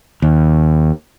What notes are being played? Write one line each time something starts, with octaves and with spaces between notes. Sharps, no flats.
D#2